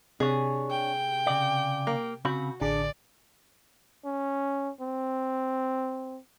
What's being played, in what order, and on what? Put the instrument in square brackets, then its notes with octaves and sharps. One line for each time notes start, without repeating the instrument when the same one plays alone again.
[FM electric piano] C3 [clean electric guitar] D4 C#5 [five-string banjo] G#4
[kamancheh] G5
[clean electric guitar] C#3 D5
[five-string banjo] A#3
[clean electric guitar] C#3 C4 B5 [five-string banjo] F#4
[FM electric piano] A1 D3 G#4 [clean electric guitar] D4 [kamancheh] D5
[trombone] C#4
C4